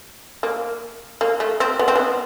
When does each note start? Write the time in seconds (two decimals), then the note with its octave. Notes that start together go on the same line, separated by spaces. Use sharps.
0.43 A#3
1.21 A#3
1.40 A3
1.60 C4
1.79 B3
1.88 C4
1.96 B3